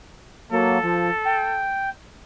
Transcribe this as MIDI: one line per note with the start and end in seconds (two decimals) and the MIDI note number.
0.52 0.78 54
0.52 0.78 58
0.52 1.69 69
0.83 1.10 53
1.26 1.89 79